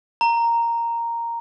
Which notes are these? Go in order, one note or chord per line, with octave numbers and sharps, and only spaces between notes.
A#5